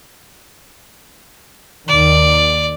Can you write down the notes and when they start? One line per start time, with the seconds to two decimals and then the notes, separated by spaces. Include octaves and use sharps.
1.88 D#2 D#3 D5